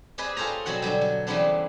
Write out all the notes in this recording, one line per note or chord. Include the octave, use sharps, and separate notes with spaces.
C4 G4 G#4 B4 D#5
F4 G#4 A4 C5 C#5 A#5
B2 F#3 C4 F#4 F#5
B2 D3 F#3 G3
F#3
C#3 E3 G3 B3 C4 D4